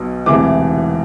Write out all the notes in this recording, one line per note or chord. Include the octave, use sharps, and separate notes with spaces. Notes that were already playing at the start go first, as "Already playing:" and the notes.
Already playing: B1 B2
E1 D2 C3 E3 D6